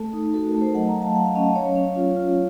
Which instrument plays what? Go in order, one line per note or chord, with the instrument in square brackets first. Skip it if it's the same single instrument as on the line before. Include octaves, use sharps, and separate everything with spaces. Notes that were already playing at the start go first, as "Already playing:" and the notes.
Already playing: [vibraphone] A3 A4
D#4
F#4 A4
F#4 A#4
A3
A4 C5
F#3 D#5 F#5
F#5 A#5
F#3
F5 A5
F#3 F#5
F5
C#4 D#5 F#5
F#3 C#5 F5
C#4
F4
F4